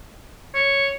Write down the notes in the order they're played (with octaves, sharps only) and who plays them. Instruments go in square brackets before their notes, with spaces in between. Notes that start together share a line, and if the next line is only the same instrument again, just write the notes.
[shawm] C#5